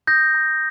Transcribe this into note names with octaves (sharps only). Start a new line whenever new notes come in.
D#6 G6 A#6
A#5